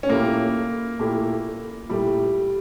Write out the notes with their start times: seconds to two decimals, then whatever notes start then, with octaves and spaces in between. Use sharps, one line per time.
0.03 C#4
0.09 A#2 A3 A#3 E4 G4
0.99 A#2 A3 E4 G4
1.89 A#2 G3 A3 E4 G4